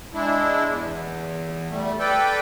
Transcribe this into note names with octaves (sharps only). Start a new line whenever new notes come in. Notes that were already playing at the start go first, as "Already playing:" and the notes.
G#3 D4 E4
E2
G3 A3
A4 B4 D5 G5